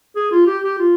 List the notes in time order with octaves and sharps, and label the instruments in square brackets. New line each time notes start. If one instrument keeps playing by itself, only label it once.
[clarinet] G#4
F4
G4
G4
F4